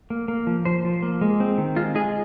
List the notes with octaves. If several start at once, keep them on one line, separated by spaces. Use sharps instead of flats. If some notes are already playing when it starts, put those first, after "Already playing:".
A#3
A#3
F3
F3 C5
F3
A#3
G#3
C4
D#3
G#3 F4
G#3 G#4